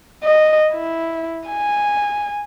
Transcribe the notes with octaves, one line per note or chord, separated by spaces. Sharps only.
D#5
E4
G#5